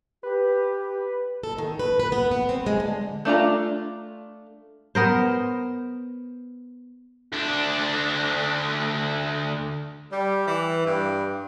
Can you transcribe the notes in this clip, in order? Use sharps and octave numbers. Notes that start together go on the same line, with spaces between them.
G4 B4
A4
D#3
B4
B4
B3
B3
C4
G#3
D3
A3 D4 F4 A#5
B3 A#4 C5
D2 D4
G3
E3
G2